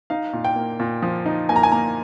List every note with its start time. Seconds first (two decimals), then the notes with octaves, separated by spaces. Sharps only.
0.10 D#4 F5
0.33 A#2
0.45 G5
0.56 A#3
0.80 A#2
1.02 F3
1.26 D#4
1.49 A#3 G#5
1.56 A#5
1.63 G#5
1.72 A#3 A#5